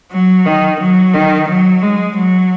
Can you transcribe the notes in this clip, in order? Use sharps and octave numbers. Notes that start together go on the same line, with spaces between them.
F#3
D#3
F#3
D#3
F#3
G#3
F#3